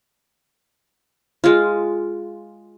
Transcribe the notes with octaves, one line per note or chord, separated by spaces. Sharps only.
G#3 F4